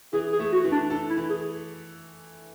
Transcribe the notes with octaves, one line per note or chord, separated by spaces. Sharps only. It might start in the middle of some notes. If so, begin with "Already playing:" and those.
E3 G#4
G#4
A3
F#4
E3
D4
D4 A4
E4
E3
G#4